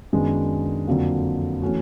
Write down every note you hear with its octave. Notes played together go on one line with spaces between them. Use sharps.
F#2 D#3 G#3 B3 D4
F2 D3 F#3 A#3
E3 A3 C#4 F#4